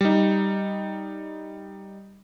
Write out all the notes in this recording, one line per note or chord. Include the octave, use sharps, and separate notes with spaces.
G3 D#4